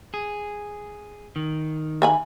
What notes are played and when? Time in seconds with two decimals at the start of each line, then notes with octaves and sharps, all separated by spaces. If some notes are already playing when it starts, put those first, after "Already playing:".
0.14 G#4
1.36 D#3
2.02 E5 G#5 B5